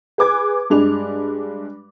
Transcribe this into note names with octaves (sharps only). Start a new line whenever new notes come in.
G#4 B4 D6 G#6
G2 G#3 D4 F7